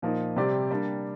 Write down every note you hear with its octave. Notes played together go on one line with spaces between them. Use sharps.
A#2 F3 A#3 D#4
C3 G3 C4 G4 D5
G3 A#3 D4